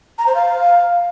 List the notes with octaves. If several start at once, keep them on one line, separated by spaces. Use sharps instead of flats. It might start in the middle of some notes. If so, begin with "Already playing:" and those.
A#5
C5
F5